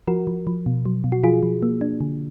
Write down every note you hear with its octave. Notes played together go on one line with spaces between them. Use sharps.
F3 F#4 A#4
F3
F3
B2
F#3
B2
F#4
F3 F4 G#4
F3
A#3
D4
D3